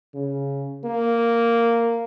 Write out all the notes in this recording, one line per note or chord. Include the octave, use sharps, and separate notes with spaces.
C#3
A#3